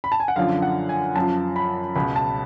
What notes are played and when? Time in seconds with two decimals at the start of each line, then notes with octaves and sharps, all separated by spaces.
0.04 B5
0.12 A5
0.20 G#5
0.28 F#5
0.36 F#2 D3 F3 F5
0.62 F#5
0.89 G#5
1.16 F#2 F3 A5
1.56 B5
1.96 C#2 B2 B5
2.16 A5